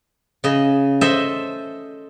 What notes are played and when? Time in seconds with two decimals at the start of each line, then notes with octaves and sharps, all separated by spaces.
0.44 C#3 D#5
1.01 A4 C5 D#5 E5